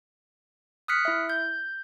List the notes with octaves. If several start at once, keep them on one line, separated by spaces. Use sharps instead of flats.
D#6 F6 F#6 B6 C#7
E4 E5
G6